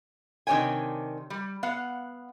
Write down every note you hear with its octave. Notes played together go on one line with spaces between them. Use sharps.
C3 D#3 D4 C#5 G5 G#5
G3
B3 F5 F#5